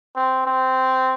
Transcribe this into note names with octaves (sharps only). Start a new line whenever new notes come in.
C4
C4